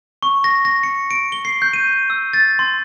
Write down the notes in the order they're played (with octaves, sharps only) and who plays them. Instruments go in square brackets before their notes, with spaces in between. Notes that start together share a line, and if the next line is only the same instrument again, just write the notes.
[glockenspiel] C#6
A#6
A#6
C#7
D7
G7
C7
G6
D#7
E6
A6
C6